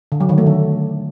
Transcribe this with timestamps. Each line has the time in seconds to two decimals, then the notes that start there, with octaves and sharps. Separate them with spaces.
0.12 D3
0.20 F#3
0.29 D#3
0.38 A3
0.46 D3